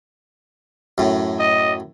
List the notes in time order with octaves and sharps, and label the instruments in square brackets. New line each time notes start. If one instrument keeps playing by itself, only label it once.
[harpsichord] F#2 A2
[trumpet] D#5